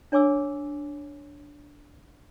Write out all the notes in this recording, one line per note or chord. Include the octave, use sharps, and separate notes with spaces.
D4 C#5 G#5 D6 E6